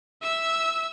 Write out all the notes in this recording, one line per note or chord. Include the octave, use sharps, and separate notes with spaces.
E5 E6